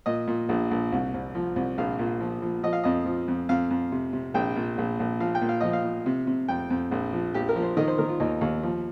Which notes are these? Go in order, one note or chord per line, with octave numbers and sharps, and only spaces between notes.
A#2 D#5
A#2
A#1
A#1
C2
C2
F3
C2
A#1 F5
A#2
F3
F3
F3 D#5
F5
F2 D#5
F3
F2
F2 F5
F2
C3
C3
A#1 G5
A#2
A#1
A#1
F3 F5
G5
A#2
F5
F3 D#5
F5
F3
C3
C3
F2 G5
F2
A#1
F3
A#1 G4
A#4
F3
C5
D#3 D#5
C5
D#3 A#4
F4
D#2 D#4
D#2
F3